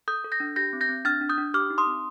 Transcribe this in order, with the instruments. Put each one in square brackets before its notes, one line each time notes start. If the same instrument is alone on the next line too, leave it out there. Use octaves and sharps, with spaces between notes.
[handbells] A4 D#6 G6
A4
G6 A#6
D4
G4 G6 A#6
C4
G6 A#6
C4
D4 F6 A6
D4
D#6 G6
D4
G4 D6 F6
D#4
C6 D#6
C4